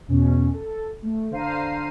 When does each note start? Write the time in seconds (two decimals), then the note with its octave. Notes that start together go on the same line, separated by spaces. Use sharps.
0.08 E2 B2 C#4
0.53 A4
1.02 A3
1.31 D3 C5 F5 A#5 C7 D#7